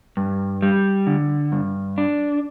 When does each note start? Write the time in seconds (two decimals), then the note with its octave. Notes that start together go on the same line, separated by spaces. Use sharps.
0.17 G2
0.62 G3
1.07 D3
1.52 G2
1.98 D4